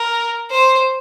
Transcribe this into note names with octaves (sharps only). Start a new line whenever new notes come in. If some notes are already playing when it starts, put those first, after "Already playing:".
Already playing: A#4
C5